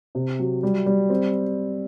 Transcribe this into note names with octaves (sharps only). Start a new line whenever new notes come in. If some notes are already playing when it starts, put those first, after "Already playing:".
C3
F#3
G3
G3
C4